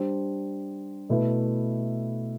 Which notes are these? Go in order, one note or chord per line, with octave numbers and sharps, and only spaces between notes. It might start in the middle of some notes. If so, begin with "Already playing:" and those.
Already playing: G3 D4 G4 C5
B2 A3 E4 B4